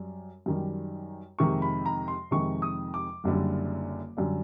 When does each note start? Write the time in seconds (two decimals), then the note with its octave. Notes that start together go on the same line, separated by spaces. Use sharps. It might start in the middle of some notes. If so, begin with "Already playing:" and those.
Already playing: F#2 G3
0.46 F#2 D#3 G3
1.39 F2 C3 D#3 G#3 C#6
1.62 B5
1.86 A#5
2.08 C6
2.31 F2 C3 D#3 G#3 C#6
2.62 D#6
2.94 D6
3.24 F#1 F#2 D3 G3
4.17 F#2 D3 G3